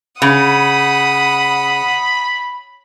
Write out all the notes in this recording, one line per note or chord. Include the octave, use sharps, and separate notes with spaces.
C#3 F#5 B5 D#6